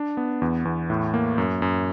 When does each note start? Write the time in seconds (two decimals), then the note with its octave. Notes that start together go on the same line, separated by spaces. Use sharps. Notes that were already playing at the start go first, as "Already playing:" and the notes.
Already playing: D4
0.17 B3
0.42 E2
0.65 E2
0.90 A2
1.14 A#3
1.38 F#2
1.62 F#2